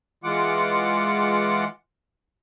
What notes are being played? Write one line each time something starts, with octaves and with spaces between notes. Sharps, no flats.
E3 G#3 F4 F#5 D6